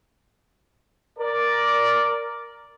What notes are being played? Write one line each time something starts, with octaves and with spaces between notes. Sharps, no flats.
A#4 D5